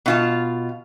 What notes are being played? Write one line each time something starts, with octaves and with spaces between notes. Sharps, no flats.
B2 F4 A5